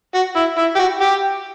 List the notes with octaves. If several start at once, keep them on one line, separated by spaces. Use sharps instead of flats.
F#4
E4
E4
G4
F#4
G4